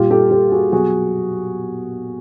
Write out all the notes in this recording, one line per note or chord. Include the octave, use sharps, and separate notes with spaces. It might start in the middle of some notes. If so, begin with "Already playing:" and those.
Already playing: A#2 G3 F4 G4
G4 A4
G4 A4
F#4 G#4
B2 F#3 F#4 G#4